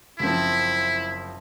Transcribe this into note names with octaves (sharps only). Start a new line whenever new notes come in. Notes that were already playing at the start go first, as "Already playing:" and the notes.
F#1 F3 C4 E4